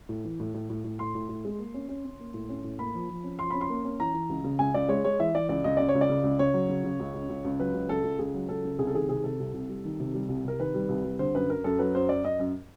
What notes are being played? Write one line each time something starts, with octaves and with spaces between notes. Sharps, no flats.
A2
E3
A2
A2
A2
A2
A2 C6
A2
A2
G#3
A#3
C#4
C#4
C#4
A#3
A2
C#4
A2
A#3 B5
F3
F3
C#4
F3 C6
C#4 B5
C6
A#3
C#4
E3 A#5
E3
C#2
C#3
C#2 G#5
C#2 D5
G#3 C#5
G#3 C#5
E3 E5
E3 D5
C#2 D5
C#2 D#5
C#3 D5
C#5
C#2
D5
C#3
C#2
C#3 C#5
F#3
C#3
C#3
C#2
C#2
C#2
C#2
F#3 B4
C#2
C#2 A4
C#2
C#2 G#4
F#3
C#2 A4
C#3
C2 G#4
A4
D#3 G#4
C3 G#4
C3 A4
C2
C2
G3
D#3
C3
G3
C2
C3 A#4
D#3 B4
G3
C2
G3
D3 C5
F#2 B4
F#2 A#4
F#2 A4
F#3 B4
F#2 C5
F#2 D5
F#2 D#5
F#2